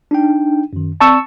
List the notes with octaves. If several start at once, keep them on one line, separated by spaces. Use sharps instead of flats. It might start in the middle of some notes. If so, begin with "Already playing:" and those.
D4 D#4 G5
F#2 D#3
C4 D5 A5 C#6 E6